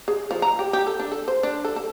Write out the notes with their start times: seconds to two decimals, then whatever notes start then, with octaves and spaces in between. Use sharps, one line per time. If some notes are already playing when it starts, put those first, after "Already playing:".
0.08 G#4
0.31 F3
0.42 A#5
0.59 G4
0.73 G4
0.87 A4
0.99 D4
1.12 A4
1.28 C5
1.43 D4
1.65 A4
1.76 A4